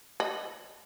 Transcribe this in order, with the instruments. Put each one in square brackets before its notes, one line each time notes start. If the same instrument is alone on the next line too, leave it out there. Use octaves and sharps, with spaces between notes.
[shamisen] D#5 B5